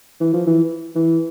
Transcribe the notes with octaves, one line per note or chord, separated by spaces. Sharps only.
E3
F3
E3
E3